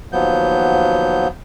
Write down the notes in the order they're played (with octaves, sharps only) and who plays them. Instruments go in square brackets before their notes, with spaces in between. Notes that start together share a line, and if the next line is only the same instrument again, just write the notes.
[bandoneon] D#2 F3 F#3 B3 G6